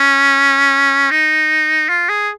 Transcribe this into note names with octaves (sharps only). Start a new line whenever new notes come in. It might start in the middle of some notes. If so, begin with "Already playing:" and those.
Already playing: C#4
D#4
F4
G#4